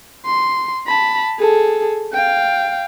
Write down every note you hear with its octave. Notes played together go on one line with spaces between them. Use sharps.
C6
A5 B5
G#4 A4
F5 G5